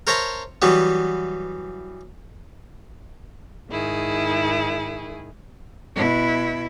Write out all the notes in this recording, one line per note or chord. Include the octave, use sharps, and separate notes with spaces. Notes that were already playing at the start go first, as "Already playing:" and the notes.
A#4 C5 C#5 E5 A5 A#5
E3 F#3 G3 B3
G#2 D#3 E4 G#4
B2 E4